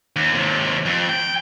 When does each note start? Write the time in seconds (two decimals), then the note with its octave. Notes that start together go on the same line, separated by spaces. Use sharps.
0.16 D#2
0.34 D#2 C3
0.86 F2
1.09 G5